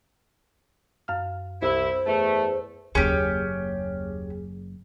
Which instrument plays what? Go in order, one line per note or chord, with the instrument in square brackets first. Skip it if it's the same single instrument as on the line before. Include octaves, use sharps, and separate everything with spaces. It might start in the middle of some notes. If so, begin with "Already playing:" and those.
[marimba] F#2 F5 F6
[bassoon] C2 [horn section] E4 [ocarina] C5
[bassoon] E2 [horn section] A3
[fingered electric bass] F#1 [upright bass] D#2 [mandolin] C#4 G4 [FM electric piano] G#4